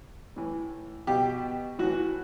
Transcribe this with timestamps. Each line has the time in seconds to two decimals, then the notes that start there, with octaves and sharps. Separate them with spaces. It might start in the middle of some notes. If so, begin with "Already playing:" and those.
0.36 A2 E3
1.07 B2 G4
1.79 A2 E3 F#4